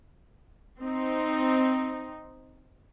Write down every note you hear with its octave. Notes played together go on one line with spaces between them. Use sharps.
C4 D#4